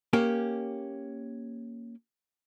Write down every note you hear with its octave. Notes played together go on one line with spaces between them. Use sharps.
A#3 C#4 G4